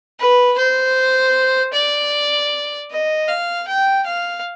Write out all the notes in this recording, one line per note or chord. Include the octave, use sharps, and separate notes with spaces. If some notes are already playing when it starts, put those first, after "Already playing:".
B4
C5
D5
D#5
F5
G5
F5